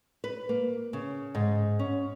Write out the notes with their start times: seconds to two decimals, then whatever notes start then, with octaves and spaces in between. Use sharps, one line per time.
0.24 B4
0.49 A#3
0.93 C#3
1.35 G#2
1.79 C#4